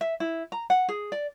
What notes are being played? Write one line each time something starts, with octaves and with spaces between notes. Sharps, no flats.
E5
E4
A#5
F#5
G#4
D5